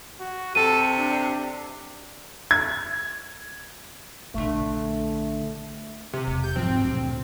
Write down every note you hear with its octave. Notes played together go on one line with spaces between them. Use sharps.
F#4
C3 A4 D#7
D4
G#6
A#1 D3 A3
C3
E1
G6
G#2 F3 F#3 C4
D2 A#2